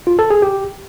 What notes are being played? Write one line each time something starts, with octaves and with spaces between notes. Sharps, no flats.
F4
A4
G#4
G4